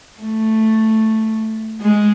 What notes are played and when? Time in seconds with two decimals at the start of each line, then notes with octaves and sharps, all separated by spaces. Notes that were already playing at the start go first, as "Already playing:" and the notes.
0.21 A3
1.81 G#3